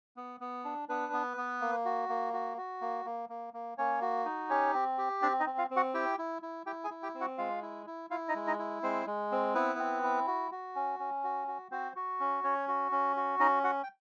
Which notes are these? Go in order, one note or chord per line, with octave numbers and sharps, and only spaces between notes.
B3
B3
D4
B3 D4 B4
B3
B3
A#3
F#4
A#3
F#4
F#4
A#3
A#3
A#3
A#3
A#3 C#4 C#5
F#4
D#4
C#4 G4 C#5
C4
G4
C4 D4 D5
D#4 D#5
C4
F4 F5
C4
F#4 F#5
E4 G4 G5
E4
E4
E4 G4 G5
G#4 G#5
E4
G4 G5
C4
F#4 F#5
G#3 F4 F5
E4
E4
E4 F4 F5
D#4 D#5
G#3
D#4 D#5
E4
G#3 C4 C5
G#3
C4
B3 E4 B4
C4
E4
F#4
F#4
C#4
C#4
F#4
F#4
C4 F#4 C5
F#4
C#4
C#4 C#5
F#4
C#4
F#4
C#4 D#4 D#5
F#4 F#5
G5